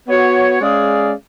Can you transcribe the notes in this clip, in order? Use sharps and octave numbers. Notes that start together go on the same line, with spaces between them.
B3 F#4 C#5
G#3 C#4 G#4 D5 F5